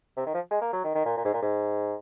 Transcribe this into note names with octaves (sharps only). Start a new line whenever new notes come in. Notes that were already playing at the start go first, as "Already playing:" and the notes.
C3
D#3
F3
G#3
A#3
F#3
D#3
D#3
A#2
A#2
G#2
A#2
G#2